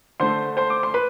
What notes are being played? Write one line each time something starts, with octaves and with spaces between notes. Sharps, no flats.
D3 A3 C5 C6
C5 C6
D6
C6
B4 B5